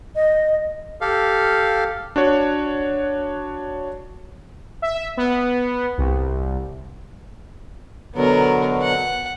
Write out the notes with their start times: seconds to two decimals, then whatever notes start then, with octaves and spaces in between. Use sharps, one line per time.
0.16 D#5
1.01 G4 A4 F5
2.16 D4 F#4 C#5
4.82 E5
5.17 B3
5.98 C2
8.16 B2 D3 F#3 B3 A#4
8.82 F#5